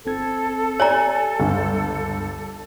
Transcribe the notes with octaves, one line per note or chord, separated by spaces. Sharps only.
G1 C4 A4 G#6
G4 C#5 D5 G#5 A#5
G1 C#2 G3